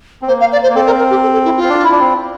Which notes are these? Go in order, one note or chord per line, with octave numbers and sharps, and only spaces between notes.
C4
A#3 C5
F5
D5
C5
A#3
C4 A4
A#4
A#4
G4
A4
A4
E4
F4
C4
D4
E4
D4
C4